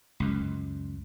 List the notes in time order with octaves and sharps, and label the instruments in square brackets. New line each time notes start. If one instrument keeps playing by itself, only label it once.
[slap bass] C#2 F#2